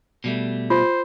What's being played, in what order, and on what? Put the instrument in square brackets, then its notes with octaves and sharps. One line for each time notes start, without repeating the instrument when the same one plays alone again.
[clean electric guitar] B2 G3 A3
[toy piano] F4 [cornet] C5